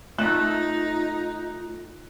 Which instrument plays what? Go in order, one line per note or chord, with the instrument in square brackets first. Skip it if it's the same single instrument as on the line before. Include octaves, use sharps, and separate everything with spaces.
[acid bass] A3 [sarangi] D#4 [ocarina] F4 [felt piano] F#6